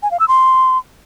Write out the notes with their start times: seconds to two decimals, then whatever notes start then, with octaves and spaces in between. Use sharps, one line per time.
0.03 G#5
0.11 F5
0.20 E6
0.28 C6